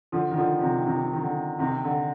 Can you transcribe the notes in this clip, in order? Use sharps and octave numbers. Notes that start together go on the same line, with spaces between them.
D3 F3
D#3
D3 F3
F3
C3 D#3
C3 D#3
D#3
D3
C3 D#3
D3